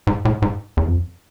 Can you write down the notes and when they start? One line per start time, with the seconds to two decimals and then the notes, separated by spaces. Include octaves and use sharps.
0.07 G#2
0.25 A2
0.42 G#2
0.77 E2
0.88 F2